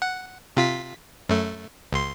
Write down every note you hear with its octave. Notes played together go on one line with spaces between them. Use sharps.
F#5
C3 F4 B6
F#2 A3
C#2 C6